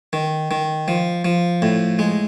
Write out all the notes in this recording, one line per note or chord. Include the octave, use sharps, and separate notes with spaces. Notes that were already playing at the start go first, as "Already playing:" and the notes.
D#3
D#3
F3
F3
A2
G#3